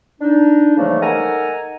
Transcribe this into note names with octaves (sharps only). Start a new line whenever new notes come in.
D4 D#4
C#3 E3 F3 G3 A3 A#3
D#4 A4 A#4 F#5 G#5 A#5